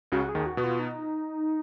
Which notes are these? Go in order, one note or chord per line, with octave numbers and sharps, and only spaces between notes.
C#2 C#3 F#4
G#4
D#2 D#3
F#4
B2 B3
F4
D#4